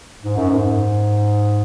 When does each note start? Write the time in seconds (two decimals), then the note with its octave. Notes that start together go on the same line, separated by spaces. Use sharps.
0.24 G#2
0.37 F#2
0.50 G#2